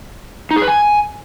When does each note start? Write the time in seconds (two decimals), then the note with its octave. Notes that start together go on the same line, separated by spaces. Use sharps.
0.51 D#4
0.56 G#4
0.62 B4
0.68 G#5